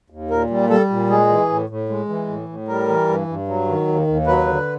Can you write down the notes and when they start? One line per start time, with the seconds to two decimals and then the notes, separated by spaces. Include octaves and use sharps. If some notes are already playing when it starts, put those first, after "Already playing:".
0.10 D#2
0.31 A#2 A#4
0.50 G3
0.70 G3 A4
0.90 A#2
1.10 G#3 G#4
1.29 E3
1.49 A2
1.69 A2
1.89 G#3
2.09 E3
2.28 A2
2.49 A2
2.68 G3 A#4
2.88 E3
3.08 G2
3.28 G2
3.48 F#3
3.68 D#3
3.88 D#2
4.07 D#2
4.27 F#3 B4
4.47 D3